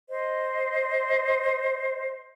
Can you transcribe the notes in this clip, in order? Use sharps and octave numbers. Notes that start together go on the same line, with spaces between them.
C5 D#5